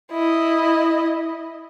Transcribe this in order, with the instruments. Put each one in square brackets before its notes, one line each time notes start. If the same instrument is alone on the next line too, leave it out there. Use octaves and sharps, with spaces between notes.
[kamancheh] E4 D#5